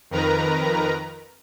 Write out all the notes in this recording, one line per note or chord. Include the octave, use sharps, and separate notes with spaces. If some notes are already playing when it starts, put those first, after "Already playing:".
F2 D#3 A#4 B4 A#5